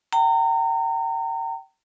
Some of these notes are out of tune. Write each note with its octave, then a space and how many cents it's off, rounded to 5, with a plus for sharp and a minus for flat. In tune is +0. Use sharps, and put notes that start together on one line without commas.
G5 -30 A#5 -30